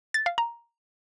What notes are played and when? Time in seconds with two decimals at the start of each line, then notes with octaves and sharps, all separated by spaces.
0.14 A6
0.26 F5
0.38 A#5